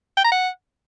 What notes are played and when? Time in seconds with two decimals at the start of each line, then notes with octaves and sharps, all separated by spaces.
0.17 G5
0.24 A#5
0.32 F#5